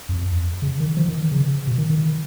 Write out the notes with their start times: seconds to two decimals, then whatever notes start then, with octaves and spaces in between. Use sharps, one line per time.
0.09 F2
0.62 C#3
0.80 D#3
0.97 F3
1.09 D#3
1.32 C#3
1.67 B2
1.78 D#3
1.90 D#3